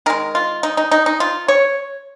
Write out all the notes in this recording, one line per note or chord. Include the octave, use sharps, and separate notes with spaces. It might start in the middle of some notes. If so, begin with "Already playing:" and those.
D#3 G#3 A#4
F4
D#4
D#4
D#4
D#4
F4
C#5